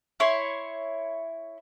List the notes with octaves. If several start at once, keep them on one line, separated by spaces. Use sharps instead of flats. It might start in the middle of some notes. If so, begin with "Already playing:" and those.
E4 C#5 C6